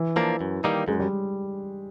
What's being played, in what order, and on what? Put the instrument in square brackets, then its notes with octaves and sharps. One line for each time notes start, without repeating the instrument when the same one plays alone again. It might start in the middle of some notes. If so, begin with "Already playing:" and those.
Already playing: [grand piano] E3
[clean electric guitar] F3 A#3 D4
F#2
D#3 G3 A#3 D#4
[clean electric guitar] F#2 [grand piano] G#3
[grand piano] G3